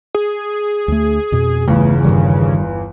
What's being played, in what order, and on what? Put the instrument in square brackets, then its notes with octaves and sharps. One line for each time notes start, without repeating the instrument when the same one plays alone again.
[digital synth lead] G#4
[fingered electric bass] D2 A3
F2 B2
[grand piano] G1 E2 [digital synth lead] C#3 [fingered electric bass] A3
[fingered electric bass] G2 D#3 G3